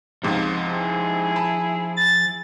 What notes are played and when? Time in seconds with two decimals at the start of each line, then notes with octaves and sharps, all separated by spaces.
0.23 C#2 G#2 C3 F3 F5
0.69 E4 G#4
1.36 A5 B5
1.97 A6